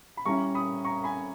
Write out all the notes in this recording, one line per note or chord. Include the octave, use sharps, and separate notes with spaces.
B5
G3 C#4 E4 A#5 C#6
B5 D#6
A#5 C#6
G#5 B5